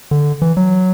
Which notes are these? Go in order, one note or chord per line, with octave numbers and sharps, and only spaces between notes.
D3
E3
F#3